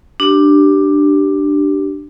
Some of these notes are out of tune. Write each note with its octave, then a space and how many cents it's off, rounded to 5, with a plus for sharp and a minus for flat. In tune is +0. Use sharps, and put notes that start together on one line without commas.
D4 +10 G4 -20